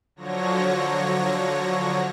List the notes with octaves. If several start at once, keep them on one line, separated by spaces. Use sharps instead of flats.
D3 F3 F#3 C#5 A#6